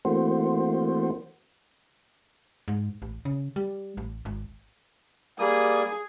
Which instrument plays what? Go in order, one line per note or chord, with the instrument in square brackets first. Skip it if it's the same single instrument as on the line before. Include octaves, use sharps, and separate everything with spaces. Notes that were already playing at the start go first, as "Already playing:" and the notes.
[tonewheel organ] E3 A3 A#3 C4 F#4 C5
[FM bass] G#2
A1
C#3
G3
A1
G#1
[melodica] G3 A#3 D#6 [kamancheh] G#4